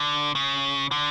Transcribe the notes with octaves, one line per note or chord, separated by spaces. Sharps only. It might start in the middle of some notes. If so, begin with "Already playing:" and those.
Already playing: D3
C#3
D3